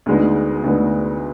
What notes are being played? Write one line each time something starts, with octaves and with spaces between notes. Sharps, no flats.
D2 D3 G#3 B3 D#4
D2 D3 G#3 B3 D#4